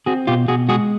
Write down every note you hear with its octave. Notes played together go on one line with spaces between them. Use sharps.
C4 F#4 G#4
B2 F4 G4
B2 F#4 G#4
G#3 F#4 G#4